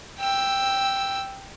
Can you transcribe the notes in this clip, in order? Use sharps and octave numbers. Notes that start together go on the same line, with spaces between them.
G5 E6